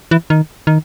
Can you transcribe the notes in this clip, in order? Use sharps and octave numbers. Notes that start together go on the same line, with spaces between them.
E3
D#3
D#3